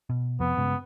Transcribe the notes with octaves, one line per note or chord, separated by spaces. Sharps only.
B2
F2 C3 F3 B3
G2 C#3 G#3